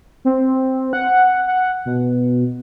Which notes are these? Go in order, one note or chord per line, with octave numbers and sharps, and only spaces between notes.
C4
F#5
F#5
B2